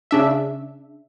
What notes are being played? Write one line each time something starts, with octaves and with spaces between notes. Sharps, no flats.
C#3 D4 E5